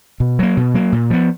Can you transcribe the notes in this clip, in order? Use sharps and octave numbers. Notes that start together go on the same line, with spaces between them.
B2
F#3 A#3
B2
F#3 A#3
A#2
F3 B3